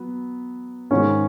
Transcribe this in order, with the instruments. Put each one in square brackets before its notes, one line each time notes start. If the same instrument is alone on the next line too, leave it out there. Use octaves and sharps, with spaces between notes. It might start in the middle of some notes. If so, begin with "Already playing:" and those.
Already playing: [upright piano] F#3 B3
[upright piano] G#2 D#3 G#3 [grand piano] C#4